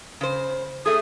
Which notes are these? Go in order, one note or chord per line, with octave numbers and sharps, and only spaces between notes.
C#3 C5
A3 G#4 A4 D#6